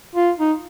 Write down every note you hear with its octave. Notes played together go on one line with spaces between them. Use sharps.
F4
D#4